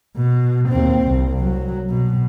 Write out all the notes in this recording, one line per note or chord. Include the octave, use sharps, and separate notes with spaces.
B2
D#2 C4
C2
F#3
B2